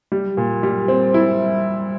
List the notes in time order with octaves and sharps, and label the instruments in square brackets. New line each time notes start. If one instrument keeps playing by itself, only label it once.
[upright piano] G3
A#2
G3
C4
E4